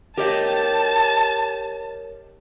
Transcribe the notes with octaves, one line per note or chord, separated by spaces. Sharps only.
G4 A#4 C#5 D#5 A5